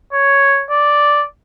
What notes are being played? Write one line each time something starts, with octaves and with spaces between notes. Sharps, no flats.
C#5
D5